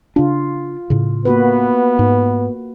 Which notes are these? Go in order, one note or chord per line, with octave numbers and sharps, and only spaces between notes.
C#3 D4 F4
A2 C#3
A#3 B3 F#4 B4
G#2